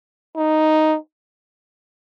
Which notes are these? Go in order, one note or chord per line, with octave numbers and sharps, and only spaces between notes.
D#4